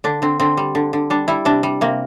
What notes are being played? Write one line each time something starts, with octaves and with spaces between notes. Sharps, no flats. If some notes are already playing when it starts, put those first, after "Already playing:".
D3 D4
D3 C4
D3 C4
G3
D3
D3
G3 D4
G3 E4
C3 D4
G3
C3 A#3